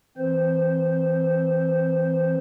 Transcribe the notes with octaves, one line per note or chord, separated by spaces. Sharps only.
E3 C4 C5